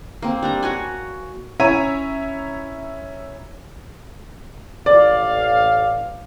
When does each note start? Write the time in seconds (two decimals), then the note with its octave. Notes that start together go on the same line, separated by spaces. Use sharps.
0.22 A#3 C4
0.43 G3 D4 A#5
0.63 F#4 C#5 G#5
1.60 C#4 E4 C#5 E5 A#5 D#7
4.86 A1 D5 F5